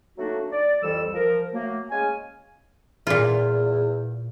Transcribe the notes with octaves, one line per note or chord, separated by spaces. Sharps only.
F#3 A3 A#3 D4 D#4 F#4
D5
C2 F2 E3 G3 A4 E6
F3 A#4
F#3 A3 A#3
G#3 C#4 F5 G#5
E2 A#2 F4